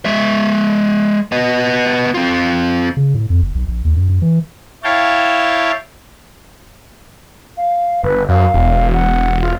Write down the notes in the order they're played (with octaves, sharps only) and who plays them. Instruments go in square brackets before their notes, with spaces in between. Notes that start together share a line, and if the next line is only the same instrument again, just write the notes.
[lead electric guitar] G#3 E5
B3 D#5
C4 F4
[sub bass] C#3
A2
F2
G1
B1
A#1
D#2
F#2
F#2
E3
[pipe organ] E4 C#5 F5 G5 A5
[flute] F5
[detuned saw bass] G1 [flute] B4
[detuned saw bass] F#2 [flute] F5
[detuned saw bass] E1
[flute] F#5
F4